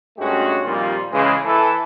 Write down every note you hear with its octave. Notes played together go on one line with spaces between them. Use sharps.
G2 G#3 A3 C#4 F#4 G4
F2 A#2 D#3 G3 F4
C#3 E3 G#3
E3 A4